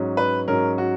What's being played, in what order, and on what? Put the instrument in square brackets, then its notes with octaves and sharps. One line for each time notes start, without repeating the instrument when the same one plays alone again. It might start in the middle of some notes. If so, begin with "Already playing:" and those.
Already playing: [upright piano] G#2 F#3 C#4
B4
G#2 F#3 C#4 A#4
F#4